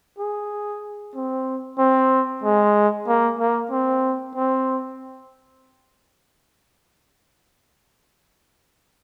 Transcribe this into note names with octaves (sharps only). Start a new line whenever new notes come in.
G#4
C4
C4
G#3
A#3
A#3
C4
C4